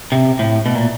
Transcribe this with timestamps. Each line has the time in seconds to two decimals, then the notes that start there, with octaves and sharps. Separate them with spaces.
0.12 C3
0.39 A2
0.66 B2
0.75 A#2